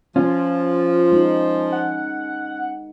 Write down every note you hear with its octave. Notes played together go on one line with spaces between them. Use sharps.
F3 C#4 F4
G#3 D#4
F#5